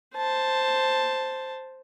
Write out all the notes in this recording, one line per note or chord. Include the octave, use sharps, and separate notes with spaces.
C5 A5